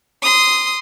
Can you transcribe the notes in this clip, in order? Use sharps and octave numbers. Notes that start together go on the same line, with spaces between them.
C6 D#6